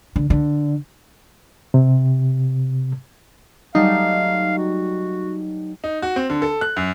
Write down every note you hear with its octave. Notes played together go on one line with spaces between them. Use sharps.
D3
D3
C3
F#3 G3 A3 D#4 F5
F#4
D#4
F#4
C4
D3
A4
F#6
F#2